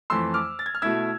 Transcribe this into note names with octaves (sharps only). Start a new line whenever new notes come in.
F2 E3 A3 C6 E6
D6 F6
A6
G#6
F6
B2 A3 E4 E6 G#6